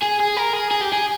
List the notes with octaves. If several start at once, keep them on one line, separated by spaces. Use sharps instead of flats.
G#4
G#4
A#4
G#4
G#4
G4
G#4